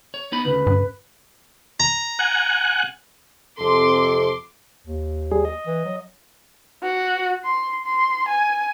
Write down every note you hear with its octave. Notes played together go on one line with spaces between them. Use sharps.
C#5
B3 D#4 B5
D2 C#3 B4
G2
A#5
F#5 G#5 F#6
F2 C3 A4 C6 D6
D#2
G3 G#4
D#5
E3
F#3
F#4
C6
C6
G#5